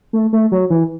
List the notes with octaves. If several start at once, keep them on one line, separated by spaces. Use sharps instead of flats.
A3
A3
F#3
E3